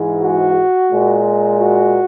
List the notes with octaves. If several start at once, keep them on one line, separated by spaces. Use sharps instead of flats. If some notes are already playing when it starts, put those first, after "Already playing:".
Already playing: G#2 E3 G#3
F#4
A#2 G#3
F#4